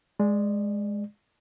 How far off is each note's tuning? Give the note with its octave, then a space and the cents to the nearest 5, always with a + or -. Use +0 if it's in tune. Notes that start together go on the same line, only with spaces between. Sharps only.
G#3 +0 D5 +20